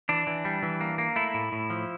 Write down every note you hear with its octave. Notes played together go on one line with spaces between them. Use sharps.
E3 D4
E3
G3
E3
A#3
A#3
A3 E4
A2
A2
F3